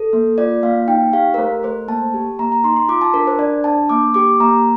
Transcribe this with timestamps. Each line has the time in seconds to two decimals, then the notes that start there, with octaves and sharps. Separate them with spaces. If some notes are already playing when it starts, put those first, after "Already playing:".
Already playing: A4
0.13 A#3
0.38 F4 D5
0.63 A#3 F5
0.88 D#4 G5
1.13 G4 F5
1.34 A#4
1.38 A3 C5
1.63 A3 C5
1.88 A#3 A5
2.14 G4
2.39 A#3 A#5
2.52 A#5
2.64 D#4 C6
2.76 C6
2.89 F4 D6
3.01 A5
3.14 D4 A#4
3.27 C5
3.39 D4 D5
3.64 D4 A5
3.89 A#3 D6
4.14 G4 D6
4.40 A#3 A#5